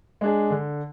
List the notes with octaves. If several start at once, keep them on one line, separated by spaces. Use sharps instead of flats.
G#3 D4 G#4
D3